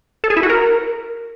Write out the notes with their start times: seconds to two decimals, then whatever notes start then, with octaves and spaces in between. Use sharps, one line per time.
0.24 A4
0.30 G#4
0.37 E4
0.43 F#4
0.49 A#4